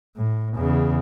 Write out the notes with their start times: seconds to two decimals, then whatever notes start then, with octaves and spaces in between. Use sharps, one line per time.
0.17 A2
0.56 E2 C#3